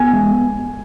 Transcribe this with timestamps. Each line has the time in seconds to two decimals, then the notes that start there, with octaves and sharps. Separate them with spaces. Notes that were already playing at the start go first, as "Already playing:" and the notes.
Already playing: B3 G#5
0.13 G#3